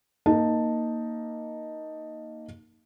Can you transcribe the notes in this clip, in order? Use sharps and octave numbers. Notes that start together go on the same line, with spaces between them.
A#3 D#4 A5